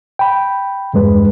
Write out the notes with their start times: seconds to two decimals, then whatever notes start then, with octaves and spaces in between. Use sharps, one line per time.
0.19 G5 B5
0.94 E2 G2 G#3 B4